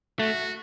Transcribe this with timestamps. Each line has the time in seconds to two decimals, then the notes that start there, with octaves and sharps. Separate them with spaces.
0.19 A3 F#4